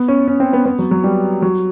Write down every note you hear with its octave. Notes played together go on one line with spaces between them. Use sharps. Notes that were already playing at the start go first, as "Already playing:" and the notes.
Already playing: B3
C#4
C#4
C4
B3
B3
F#3
F#3
G3
F#3